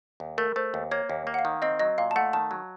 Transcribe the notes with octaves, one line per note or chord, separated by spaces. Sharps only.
D#2
A3 A#4
A3 C5
D#2
A#3 C#5
D#2
A#3
F#5
F5
D#3
C4 D#5
F#3 D#5
A#2 F5
A5
A3 F#5
D#3 A5
F#3